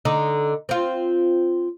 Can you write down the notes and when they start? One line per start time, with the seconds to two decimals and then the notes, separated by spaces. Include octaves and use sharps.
0.05 D3 D#4
0.69 C4 F4